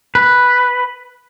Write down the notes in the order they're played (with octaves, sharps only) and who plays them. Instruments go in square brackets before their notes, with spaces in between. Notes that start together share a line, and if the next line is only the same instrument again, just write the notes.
[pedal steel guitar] B4